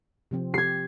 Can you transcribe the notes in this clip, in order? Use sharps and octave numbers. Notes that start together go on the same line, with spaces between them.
C3 F3 C4
G4 G#6 C7